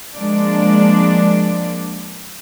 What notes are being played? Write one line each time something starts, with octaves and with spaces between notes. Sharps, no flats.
F3 G#3 A#3 D4 D5